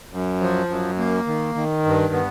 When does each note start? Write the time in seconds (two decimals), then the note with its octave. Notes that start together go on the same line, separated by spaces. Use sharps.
0.11 F#2
0.40 F3
0.69 F#2
0.98 A#3
1.26 D#3
1.55 D#3
1.85 G2
2.13 B3